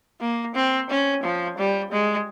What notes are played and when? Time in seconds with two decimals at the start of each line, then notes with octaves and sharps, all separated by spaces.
0.20 A#3
0.56 C4
0.90 C#4
1.23 F3
1.58 G3
1.92 G#3